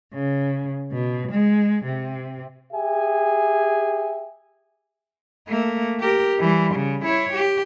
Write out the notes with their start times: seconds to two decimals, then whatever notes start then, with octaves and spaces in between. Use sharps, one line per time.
0.12 C#3
0.92 B2
1.31 G#3
1.84 C3
2.73 G4 G#4 E5 G5 G#5
5.49 A3 A#3
6.00 G4 A#4
6.40 E3 G3
6.75 C#3
7.05 E4 C#5
7.34 G4